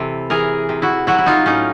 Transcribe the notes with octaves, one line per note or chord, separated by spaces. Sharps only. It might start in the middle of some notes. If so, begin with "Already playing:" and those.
Already playing: C3 E3 A4 B4
E3 G#4 A#4
C3
E4 F#4
F#3 E4 F#4
E4
D#4 F4
A2 C#4 D#4